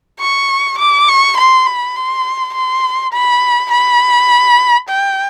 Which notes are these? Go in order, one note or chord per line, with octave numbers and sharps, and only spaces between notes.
C#6
D6
C#6
C6
B5
C6
C6
B5
B5
G5